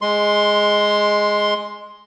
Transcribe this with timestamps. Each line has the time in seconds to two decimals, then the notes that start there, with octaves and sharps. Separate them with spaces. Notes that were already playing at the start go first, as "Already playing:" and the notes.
0.01 G#3 C6